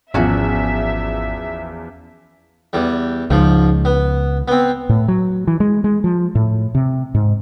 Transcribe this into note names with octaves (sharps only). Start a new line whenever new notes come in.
G#1 E2 F3 C#4 F#4 E5
E2 G3
C#2 G#2 F3
B3
B3 C4
A2
F#3
E3
G#3
G#3
F3
A2
C3
G#2